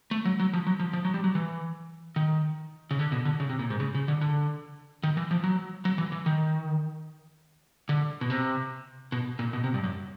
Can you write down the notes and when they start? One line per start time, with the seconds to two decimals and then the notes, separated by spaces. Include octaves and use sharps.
0.11 A3
0.25 F#3
0.40 F#3
0.53 F3
0.67 F#3
0.80 F3
0.93 F3
1.05 F#3
1.14 G3
1.24 F#3
1.35 E3
2.16 D#3
2.91 C#3
2.99 D3
3.12 B2
3.25 D3
3.40 C#3
3.49 C3
3.59 A#2
3.70 G#2
3.80 C#3
3.95 C#3
4.08 D3
4.21 D3
5.03 D#3
5.17 E3
5.31 F3
5.44 F#3
5.85 F#3
5.98 E3
6.12 E3
6.26 D#3
7.89 D3
8.21 B2
8.30 C3
9.12 B2
9.39 A#2
9.53 B2
9.64 C3
9.74 G2
9.84 F#2